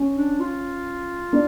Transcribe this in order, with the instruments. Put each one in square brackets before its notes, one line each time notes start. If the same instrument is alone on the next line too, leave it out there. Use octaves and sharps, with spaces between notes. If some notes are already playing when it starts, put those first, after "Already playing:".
Already playing: [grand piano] C#4
[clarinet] D4
F4
[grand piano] D4